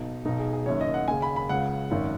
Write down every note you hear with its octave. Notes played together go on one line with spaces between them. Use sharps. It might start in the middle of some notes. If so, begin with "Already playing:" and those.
Already playing: B1 B2 D#4
B1 B2 D#4
G#4
G#4
F#1 F#2 D#3 C#5
D#5
F#5
D#2 C#3 G#5
B5
B5
C#2 C#3 F#5
G#1 F#2 D#3